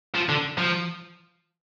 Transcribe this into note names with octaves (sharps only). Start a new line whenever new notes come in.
F3
D3
F3